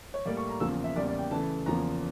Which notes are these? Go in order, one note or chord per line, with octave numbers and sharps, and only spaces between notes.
C#5
A2 G3 A#3 D5
C#6
A#5
E2 C#3 F3 A#3 E6
E5
E2 C#3 G3 A#3 D5
D5
G5
C#3 E3 A3 A5
E2 C#3 F3 A#3 A#5